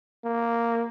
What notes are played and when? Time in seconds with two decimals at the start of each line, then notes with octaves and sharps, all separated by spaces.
0.25 A#3